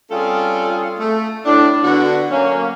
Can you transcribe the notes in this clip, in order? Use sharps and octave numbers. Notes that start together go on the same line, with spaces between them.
G3 C4 C#4 F4 G#4 A4
A3
A2 D4
D3 B3 F#4
F#3 A#3 C#4